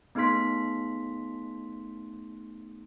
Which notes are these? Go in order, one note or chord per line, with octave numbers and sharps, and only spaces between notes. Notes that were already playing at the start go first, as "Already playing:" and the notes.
A3 B3 D#4 G#4 C6 B6